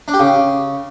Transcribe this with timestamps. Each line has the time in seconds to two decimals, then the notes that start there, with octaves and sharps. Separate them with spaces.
0.08 D4
0.14 G4
0.20 C#3